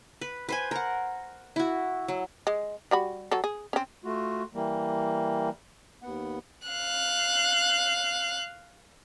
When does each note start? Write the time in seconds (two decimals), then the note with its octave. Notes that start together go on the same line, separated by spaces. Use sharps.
0.21 B4
0.49 B4 C5 G#5
0.71 A#4 F#5
1.56 E4 F#4
2.08 F#3
2.47 G#3
2.91 G3 F#4 B5
3.31 F#3 A4
3.44 G#4
3.73 C4 C#4
4.05 A3 F4 F#4
4.54 E3 G3 A#3
6.03 D#2 B3 F#5
6.68 F5 F#6